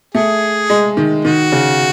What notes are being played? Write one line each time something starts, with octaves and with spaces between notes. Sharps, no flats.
A3 G#4
G#3
D#3
D#3 F#4
C#3